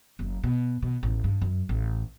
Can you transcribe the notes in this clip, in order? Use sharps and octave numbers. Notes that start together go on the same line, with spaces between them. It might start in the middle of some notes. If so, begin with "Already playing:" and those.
F#1
B2
B2
A1
G2
F#2
A1